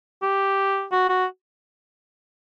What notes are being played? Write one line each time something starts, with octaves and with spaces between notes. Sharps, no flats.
G4
F#4
F#4